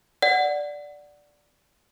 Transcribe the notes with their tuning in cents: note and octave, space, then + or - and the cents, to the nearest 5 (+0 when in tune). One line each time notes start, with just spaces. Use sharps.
D5 +0 F#5 +0